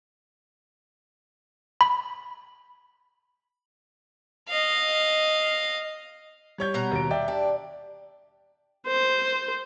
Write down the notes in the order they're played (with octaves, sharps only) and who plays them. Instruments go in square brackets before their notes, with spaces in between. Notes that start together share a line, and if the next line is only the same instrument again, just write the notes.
[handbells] B5
[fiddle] D#5 F5
[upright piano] G3 C#5 G6
[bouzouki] B2 F#5 A#5
[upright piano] D#2 D7
D5 E5 G5
[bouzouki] D4 [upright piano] G4
[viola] C5